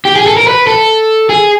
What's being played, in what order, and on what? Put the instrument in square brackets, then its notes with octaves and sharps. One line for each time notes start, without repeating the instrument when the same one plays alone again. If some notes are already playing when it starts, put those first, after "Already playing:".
[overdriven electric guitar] G4
G#4
A4
A#4
B4
A4
G#4